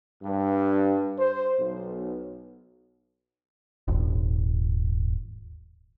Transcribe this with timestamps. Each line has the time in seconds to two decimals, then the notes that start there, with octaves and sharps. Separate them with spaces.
0.23 G2
1.19 C5
1.60 B1
3.88 D#1 G#1